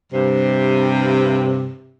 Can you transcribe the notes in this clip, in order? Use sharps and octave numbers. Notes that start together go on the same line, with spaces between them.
G2 C3